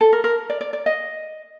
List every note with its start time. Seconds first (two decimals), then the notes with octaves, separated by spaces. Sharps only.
0.01 A4
0.13 A#4
0.24 A#4
0.50 D5
0.61 D5
0.73 D5
0.86 D#5